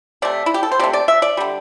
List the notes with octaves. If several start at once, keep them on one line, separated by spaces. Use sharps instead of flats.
C3 A3 D5
E4
G4
A4
C5
C3 A3 D5
D5
E5
D5
D3 G3